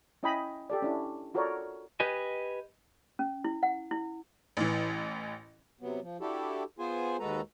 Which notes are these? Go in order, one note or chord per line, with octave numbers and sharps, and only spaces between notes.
C#4 E4 D#5 G5 G#5 B5
G4 A4 D5
C#4 D4 E4
F4 F#4 A4 A#4 C#5 D5
G4 B4 D#5 G#5
C#4
E4
F#5
E4
A1 E3
C3 F#3 B3
F3
D4 E4 F#4 G4 A4
B3 F4 G#4 C5 G#5
D#2 G#3 F#4 A4 B4 A#5